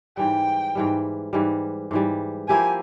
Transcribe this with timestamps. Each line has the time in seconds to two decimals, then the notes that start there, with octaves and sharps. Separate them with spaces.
0.17 G#2 E3 G3 G5
0.75 G#2 E3 G3
1.33 G#2 E3 G3
1.91 G#2 E3 G3
2.48 F3 A#3 E4 G4 G#5